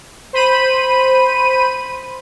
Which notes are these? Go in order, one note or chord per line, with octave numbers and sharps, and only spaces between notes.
C5 B5 D#7